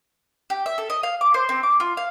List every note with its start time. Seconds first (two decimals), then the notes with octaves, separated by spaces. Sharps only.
0.50 G4
0.66 E5
0.78 A4
0.90 D#5
1.03 F5
1.21 D6
1.34 C5
1.49 C4
1.63 D6
1.80 F4
1.97 F5